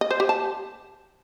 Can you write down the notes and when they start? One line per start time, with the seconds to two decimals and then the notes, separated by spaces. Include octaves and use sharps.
0.01 D#5
0.11 C5
0.20 G4
0.29 A5